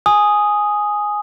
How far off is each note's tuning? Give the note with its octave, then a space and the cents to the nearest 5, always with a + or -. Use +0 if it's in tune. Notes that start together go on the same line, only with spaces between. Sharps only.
G#5 +0 D#6 +0